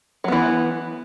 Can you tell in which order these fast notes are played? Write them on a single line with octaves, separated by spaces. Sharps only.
F#3 B3 E3